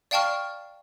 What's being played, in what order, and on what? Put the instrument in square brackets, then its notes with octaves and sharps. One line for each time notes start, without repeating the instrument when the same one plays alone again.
[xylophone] D5 F5 G5 A5 C#6 F6